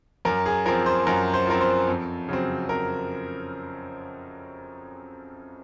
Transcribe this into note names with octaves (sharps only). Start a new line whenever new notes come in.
F#2 A#4
G#4
F3 C4 A#4
C5
F#2 A#4
C5
F3 C4 A#4
C5
F2
C#3 F#3 C4
F2 A#4